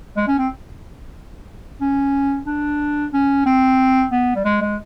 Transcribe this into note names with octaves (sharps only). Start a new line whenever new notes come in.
G#3
C#4
C4
C#4
D4
C#4
C4
B3
G3
G#3
G#3